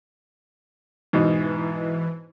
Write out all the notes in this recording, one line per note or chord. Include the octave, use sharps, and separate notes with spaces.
G#2 B2 E3 D#4